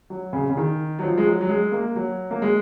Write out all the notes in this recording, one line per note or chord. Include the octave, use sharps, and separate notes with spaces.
F#3
C#3
C#3
D#3
F#3
F3
G#3
F#3
F#3
G#3
A#3
F#3
A#3
G#3